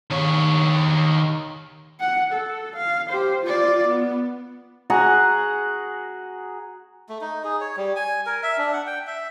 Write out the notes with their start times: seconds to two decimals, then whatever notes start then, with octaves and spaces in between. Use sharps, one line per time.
0.10 D#3 C#5
2.00 F#5
2.33 A4
2.76 F5
3.10 G4 C5
3.43 F4 D5
3.87 B3
4.90 F#4 G#4 F#5 A#5
7.09 A3
7.21 D#4
7.44 G#4
7.61 C#5
7.77 G3
7.96 G#5
8.26 A#4
8.43 E5
8.58 D4
8.73 F#5
8.87 G5
9.07 E5